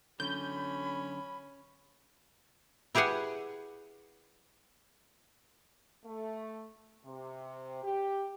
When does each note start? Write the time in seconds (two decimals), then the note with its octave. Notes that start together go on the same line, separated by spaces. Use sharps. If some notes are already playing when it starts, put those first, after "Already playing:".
0.20 F#2 D3 C#4 B5 G6
2.95 E4 G4 G#4 B4 F#5 G#5
6.05 A3
7.05 C3
7.83 G4